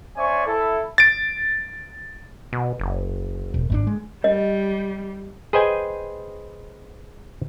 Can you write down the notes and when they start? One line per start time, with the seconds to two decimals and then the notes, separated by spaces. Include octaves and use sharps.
0.16 C#4 C5 D5 E5 G#5 C#6
0.46 E4 A4
0.98 A6 D7
2.53 B2
2.80 F#1
3.54 E1
3.70 G#1 B2 D4
3.87 G#3
4.24 G3 D#5
5.53 G#4 B4 C5 D#5 G5 G#5